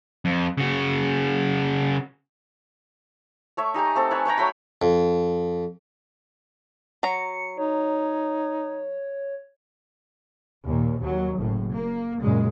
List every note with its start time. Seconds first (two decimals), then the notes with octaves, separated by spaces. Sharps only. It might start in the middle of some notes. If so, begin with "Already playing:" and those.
0.25 F2
0.58 C#3 F#4
3.57 A3 C#5 E5
3.74 D#4 G4 G#5 A#5
3.95 A3 C4 A4
4.11 B4 C#5 G#5 A5
4.25 B4 C#5 G5 A#5
4.37 F#3 A3 G5 B5
4.82 F2
7.03 F#3 A#5 C#7
7.58 D#4 C#5
10.64 D#2 A#2
11.00 D#2 F#3
11.38 F#1 A2
11.72 A#3
12.20 F#2 A#2 C#3 G#3